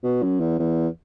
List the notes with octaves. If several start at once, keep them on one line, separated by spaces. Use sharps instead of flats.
B2
F#2
E2
E2